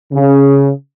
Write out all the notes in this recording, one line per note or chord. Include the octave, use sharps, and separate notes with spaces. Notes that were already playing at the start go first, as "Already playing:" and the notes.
C#3